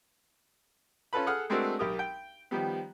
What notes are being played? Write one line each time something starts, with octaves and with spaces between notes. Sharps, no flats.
C#4 F4 A4 B4 B5
G#4 A4 F#5 D#6 F6
G#3 A3 C4 D4 F#4 A#4
B1 G4 A#4 D#6
G5
D#3 F3 G3 B3